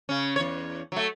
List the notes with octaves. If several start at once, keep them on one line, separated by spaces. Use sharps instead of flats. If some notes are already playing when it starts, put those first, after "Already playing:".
C#3 C#4
E2 C#5
F#3 A3